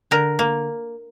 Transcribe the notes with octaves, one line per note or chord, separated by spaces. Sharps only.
D3 A#4
A#3